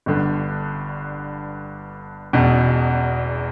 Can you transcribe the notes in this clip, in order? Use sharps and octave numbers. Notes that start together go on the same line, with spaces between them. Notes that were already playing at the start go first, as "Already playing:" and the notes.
G1 G2 D3
E1 E2 B2